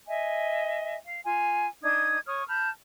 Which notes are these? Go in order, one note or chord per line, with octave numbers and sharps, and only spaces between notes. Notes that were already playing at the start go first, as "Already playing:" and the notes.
D#5 E5 G#5
F5
F4 G#5
D4 D#4 D#6 G#6
C#5 C#6 D#6 F6
A5 B5 F6 G6